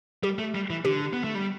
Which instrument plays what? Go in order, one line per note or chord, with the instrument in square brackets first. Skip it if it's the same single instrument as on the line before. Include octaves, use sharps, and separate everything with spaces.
[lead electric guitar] G3 [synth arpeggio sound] G4
[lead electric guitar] A3
G3
E3
[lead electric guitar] D3 [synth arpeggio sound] G4
[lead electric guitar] B3
A3
G3